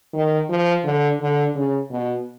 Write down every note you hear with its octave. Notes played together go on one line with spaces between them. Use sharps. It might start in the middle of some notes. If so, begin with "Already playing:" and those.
D#3
F3
D3
D3
C#3
B2